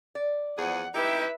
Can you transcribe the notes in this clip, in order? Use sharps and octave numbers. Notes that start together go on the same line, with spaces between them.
D5
E2 F3 G#4 F#5
D#4 E4 G4 B4 E5